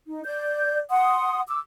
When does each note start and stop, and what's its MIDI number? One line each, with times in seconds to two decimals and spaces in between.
0.07 0.21 63
0.24 0.79 74
0.24 0.79 91
0.90 1.40 78
0.90 1.40 84
0.90 1.40 87
1.48 1.60 86
1.48 1.60 88